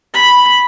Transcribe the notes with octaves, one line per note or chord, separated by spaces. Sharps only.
B5